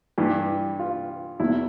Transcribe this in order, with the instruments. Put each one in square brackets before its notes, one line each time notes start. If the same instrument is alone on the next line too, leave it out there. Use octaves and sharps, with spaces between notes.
[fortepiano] G2 E3 G4
F4
E2 B2 E4